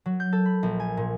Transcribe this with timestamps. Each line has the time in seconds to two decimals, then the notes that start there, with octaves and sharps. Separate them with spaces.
0.06 F#3
0.20 G6
0.33 A4
0.45 B5
0.63 A#1
0.80 G#5
0.97 A#2